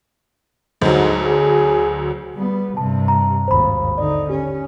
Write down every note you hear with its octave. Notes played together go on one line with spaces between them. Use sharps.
D2 G#2 F#3
G#4
G3 B3
G2 C3 A5
A#5
G#1 D#2 C5 B5
D3 D#4 D5
C#4 G4